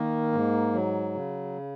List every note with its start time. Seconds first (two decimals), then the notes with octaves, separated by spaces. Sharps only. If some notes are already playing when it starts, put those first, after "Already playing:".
Already playing: D#3 A#3
0.32 G#2
0.73 F#3
1.14 C#3